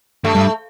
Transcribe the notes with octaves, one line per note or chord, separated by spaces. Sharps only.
G2 A3
G2